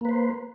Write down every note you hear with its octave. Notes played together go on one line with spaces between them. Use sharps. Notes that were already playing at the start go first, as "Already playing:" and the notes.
A#3 B4 C5